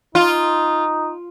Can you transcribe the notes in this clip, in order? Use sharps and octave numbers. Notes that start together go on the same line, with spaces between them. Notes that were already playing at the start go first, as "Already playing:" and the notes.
D#4 F4